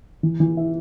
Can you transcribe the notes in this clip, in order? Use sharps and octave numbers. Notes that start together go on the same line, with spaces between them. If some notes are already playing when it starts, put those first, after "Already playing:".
E3
E3
E4